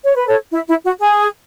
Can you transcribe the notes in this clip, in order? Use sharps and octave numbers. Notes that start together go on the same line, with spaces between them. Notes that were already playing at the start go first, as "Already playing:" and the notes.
C#5
B4
A4 C#5
E4
E4
F#4
G#4